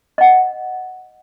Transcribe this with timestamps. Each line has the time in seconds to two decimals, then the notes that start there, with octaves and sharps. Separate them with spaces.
0.18 D#5 F#5